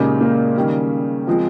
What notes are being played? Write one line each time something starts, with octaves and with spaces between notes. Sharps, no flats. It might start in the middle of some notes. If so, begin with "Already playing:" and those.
Already playing: A#2 C#3 G#3 D#4 G4 A#4
A#3
D#3 G3 C#4
F3 G#3 C4 F4